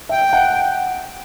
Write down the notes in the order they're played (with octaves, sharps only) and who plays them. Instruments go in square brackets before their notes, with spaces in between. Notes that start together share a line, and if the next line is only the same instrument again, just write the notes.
[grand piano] E5 [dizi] G5
[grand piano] E5
F#5